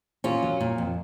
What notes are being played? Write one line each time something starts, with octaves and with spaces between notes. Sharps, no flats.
A#2 C#4 F4
F#3
A#2
F2